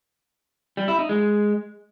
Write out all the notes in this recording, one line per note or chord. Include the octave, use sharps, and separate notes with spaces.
G3
E4
D#4
G#3